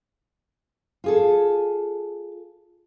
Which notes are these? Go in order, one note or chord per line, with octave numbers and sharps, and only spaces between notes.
F4 G#4 A4